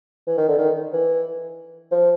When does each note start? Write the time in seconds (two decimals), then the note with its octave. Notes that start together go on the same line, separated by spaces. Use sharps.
0.27 E3
0.37 D#3
0.48 D3
0.58 D#3
0.93 E3
1.91 F3